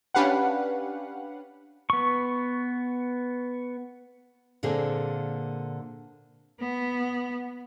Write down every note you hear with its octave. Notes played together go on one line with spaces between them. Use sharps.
C#4 D4 G4 B4 F5 F#5
B3 C#6
A#2 D3 A#3 C4 G#4
B3